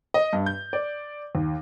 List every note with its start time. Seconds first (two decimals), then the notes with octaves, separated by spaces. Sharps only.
0.14 D#5
0.33 G2
0.46 G6
0.73 D5
1.35 D#2